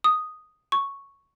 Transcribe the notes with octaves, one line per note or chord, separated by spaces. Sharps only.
D#6
C#6